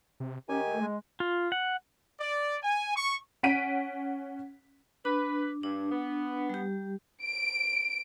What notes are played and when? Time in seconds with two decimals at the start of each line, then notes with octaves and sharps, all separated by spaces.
0.20 C3
0.49 D#3 C#4 G4 G#5
0.66 A3
0.81 G#3
1.20 F4
1.52 F#5
2.20 D5
2.63 G#5
2.96 C#6
3.43 C#4 F#5 B6 D7 D#7
5.05 D4 B4
5.63 G2 D4
5.92 B3
6.49 G3 G4
7.23 D7